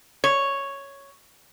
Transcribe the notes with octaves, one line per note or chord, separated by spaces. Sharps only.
C#5